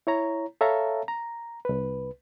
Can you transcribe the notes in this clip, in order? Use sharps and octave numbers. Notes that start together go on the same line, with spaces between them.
E4 C#5 A#5
A4 C#5 E5 F5 A5 A#5
A#5
C2 B4